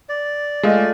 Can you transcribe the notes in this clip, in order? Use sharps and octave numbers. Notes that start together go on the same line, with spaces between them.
D5
G#3 A3 F4 D#5